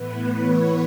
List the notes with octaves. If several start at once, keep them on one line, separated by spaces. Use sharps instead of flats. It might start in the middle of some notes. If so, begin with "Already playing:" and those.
Already playing: A2 E3 B3 B4
C#5